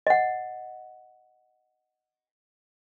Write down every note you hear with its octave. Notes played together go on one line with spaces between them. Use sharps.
D#5 F#5